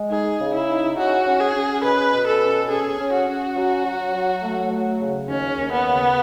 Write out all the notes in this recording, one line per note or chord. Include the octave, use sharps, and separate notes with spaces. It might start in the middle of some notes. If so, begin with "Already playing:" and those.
Already playing: G#3
D#4 G#4
C#3
E4
D#4
C#4 F#4
C#4
G#4
C#4
B2 B4
B2
A4
C#4
C#4 G#4
C#4
F#4
C#4
F#3
F#3
F#3
A3
F#3
C#3
D#2 C#4
D#2
B3
C#3